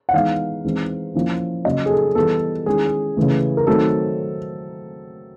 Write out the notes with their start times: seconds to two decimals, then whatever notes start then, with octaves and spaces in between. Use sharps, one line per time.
0.09 F#5
0.13 E3 G#3 B3 D#4 F5
0.64 E3 G#3 C4 D#4
1.15 F3 A#3 C#4 E4
1.65 C#3 F#3 A#3 C#4 D#5
1.86 G#4
1.90 A4
2.15 E3 G3 B3 A4
2.66 D#3 G#3 C#4 E4 G#4
3.17 C#3 E3 A3
3.57 A#4
3.67 D#3 F#3 A3 C4 A4